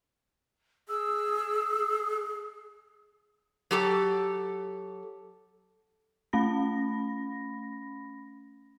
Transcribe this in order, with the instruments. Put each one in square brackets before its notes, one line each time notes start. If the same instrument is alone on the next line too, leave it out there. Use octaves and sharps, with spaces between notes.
[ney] G#4 [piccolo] E6
[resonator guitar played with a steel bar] F#3 G4 A4
[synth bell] A3 C#4 B5 A#6